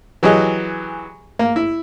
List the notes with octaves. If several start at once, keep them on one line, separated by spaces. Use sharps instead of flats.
E3 F#3 G4 G#4 D#5
A#3
E4